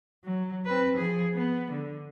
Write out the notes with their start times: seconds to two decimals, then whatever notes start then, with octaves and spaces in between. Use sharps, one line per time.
0.24 F#3
0.65 C4 B4
0.97 F3 G#4
1.34 B3
1.72 D3